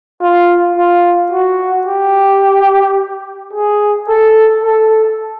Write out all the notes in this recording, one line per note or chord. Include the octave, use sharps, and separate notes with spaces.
F4
F4
F#4
G4
G#4
A4
A4